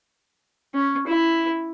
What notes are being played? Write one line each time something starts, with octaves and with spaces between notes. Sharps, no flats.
C#4
E4